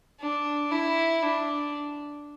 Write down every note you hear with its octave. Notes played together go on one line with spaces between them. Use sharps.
D4
E4
D4